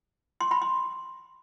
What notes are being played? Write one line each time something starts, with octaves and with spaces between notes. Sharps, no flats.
C6
B5
C6